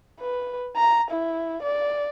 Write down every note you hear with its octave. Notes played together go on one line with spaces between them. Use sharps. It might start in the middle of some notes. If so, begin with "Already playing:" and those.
B4
A#5
E4
D5